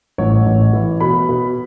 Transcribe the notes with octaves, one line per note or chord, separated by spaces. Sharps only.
A1 C#5
A1
E3
B2 B5
B2